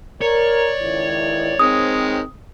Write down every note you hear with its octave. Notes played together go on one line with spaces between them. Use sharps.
A#4 C#5 D5
C#2 D#3 E4
D#3 G#3 C4 D#6